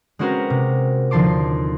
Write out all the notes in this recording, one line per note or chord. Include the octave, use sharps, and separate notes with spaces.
G#3 C4 C#4 F#4 A#4 B4
C3
D#2 D3 F3 A5 C6 D6